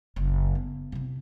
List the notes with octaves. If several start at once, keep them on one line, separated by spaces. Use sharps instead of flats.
F#1
B3
C3 E4